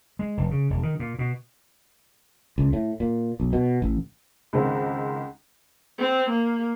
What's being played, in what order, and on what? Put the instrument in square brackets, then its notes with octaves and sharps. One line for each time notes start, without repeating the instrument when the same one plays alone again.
[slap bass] G#3
F1
C#3
E1
D#3
A#2
B2
[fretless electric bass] C#2
A2
A#2
B1
B2
A1
[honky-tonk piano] C#2 G#2 D#3 C4
[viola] C4
A#3